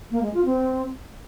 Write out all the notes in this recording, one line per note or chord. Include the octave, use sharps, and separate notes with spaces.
A#3
G#3
F4
C4